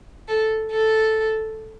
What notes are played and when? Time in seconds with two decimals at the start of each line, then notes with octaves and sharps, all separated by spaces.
0.28 A4
0.71 A4